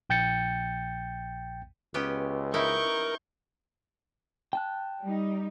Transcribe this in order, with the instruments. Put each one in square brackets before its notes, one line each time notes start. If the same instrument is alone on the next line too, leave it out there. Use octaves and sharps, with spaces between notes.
[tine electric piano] A#1 G5 G6 A6 C#7
[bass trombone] C#2 [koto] B3 C#4 G4
[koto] D#4 E4 [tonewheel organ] A#4 [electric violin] C#6 G6
[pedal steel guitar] G5 A5 F#6
[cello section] G3 D#4